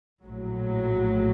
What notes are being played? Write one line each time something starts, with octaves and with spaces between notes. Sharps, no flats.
A#1 A2 F#3